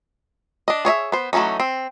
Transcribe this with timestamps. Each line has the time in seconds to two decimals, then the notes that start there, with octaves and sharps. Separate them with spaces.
0.68 D4 D#5
0.85 G#4 C#5 D#5 E5
1.12 B3 C5
1.33 E3 F#3 A3 C#4 D#4
1.60 C4